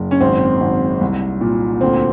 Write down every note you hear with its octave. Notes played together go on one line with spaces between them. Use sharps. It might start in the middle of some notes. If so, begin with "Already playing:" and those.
Already playing: F#1
C#4
G#1 C4
G#1
C2
A#2
D2 C4